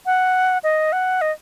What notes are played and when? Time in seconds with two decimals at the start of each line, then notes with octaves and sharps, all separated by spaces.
0.06 F#5
0.64 D#5
0.92 F#5
1.21 D#5